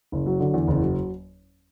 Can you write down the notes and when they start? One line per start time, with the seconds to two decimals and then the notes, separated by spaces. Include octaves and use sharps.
0.12 F#1
0.26 F#3
0.40 D3
0.54 E2
0.68 F#1
0.82 F#3